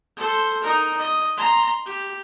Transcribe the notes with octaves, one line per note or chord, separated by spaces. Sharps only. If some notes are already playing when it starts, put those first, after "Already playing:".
A4 C5
D#4 A#4
D#5
A#5 C6
G4